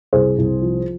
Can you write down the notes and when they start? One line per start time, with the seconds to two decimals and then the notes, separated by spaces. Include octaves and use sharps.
0.13 C2 G#4 C5
0.38 C2
0.62 F3